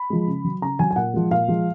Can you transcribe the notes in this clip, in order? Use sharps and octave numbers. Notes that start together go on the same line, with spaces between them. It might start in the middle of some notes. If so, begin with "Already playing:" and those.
Already playing: B5
F3 G#3
C#3
F#3
C#3 A#5
F#3 G#5
G#5
A#2 F#5
F3 G#3
A#2 F5
F3 G#3